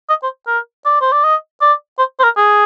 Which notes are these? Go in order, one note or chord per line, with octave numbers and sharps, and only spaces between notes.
D#5
C5
A#4
D5
C5
D5
D#5
D5
C5
C5
A#4
G#4